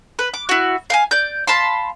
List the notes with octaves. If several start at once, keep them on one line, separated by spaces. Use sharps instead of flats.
B4
D6
E4 F#4
F5 G5 G#5
D5 G6
F5 A5 B5 C6